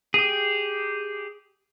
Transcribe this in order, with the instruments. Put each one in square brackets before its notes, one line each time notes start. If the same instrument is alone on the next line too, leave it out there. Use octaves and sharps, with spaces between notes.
[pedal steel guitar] G4 G#4